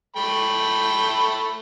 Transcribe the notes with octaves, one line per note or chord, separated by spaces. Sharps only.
A3 G5 B5